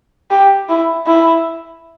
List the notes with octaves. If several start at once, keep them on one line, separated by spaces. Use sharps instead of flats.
G4
E4
E4